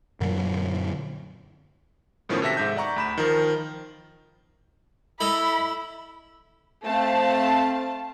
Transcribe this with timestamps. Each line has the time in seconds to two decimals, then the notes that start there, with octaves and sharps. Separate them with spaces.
0.20 F#2 A#2 D3 F#3
2.29 A2 D#3 F3 A3 B3 C#4
2.42 C3 F#4 A4 E5 A#6 B6
2.57 G#2 E5 G6
2.76 D5 F#5 A#5 C#6
2.96 D2 B5 E7
3.17 D#3 F3 A#4
5.21 E4 A4 D#5 A#5 B5 E6 F#7
6.85 A3 C4 F5 A5